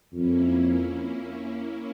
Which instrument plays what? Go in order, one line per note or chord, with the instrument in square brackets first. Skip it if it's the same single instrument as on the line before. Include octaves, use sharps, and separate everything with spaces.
[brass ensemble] F2 [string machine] A#3 C#4 E4